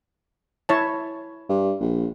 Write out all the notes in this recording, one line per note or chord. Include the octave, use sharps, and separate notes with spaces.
E4 C#5 A5
G2
A#1